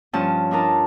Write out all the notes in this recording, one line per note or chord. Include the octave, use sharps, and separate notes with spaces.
G2 F3 C#4 A5
D4 D#4 F4 A#4 A5